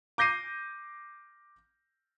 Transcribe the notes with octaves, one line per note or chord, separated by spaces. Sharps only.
D6 G6 A#6 C7 D#7